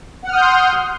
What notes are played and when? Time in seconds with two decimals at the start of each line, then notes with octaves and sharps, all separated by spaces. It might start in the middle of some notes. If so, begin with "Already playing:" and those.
0.24 F#5
0.28 F6
0.33 D#6
0.37 G6
0.41 C6